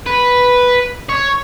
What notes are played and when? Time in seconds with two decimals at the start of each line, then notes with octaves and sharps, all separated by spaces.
0.06 B4
1.09 C#5